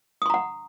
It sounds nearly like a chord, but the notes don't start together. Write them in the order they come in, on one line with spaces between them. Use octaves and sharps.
D#6 C6 A#5 F#5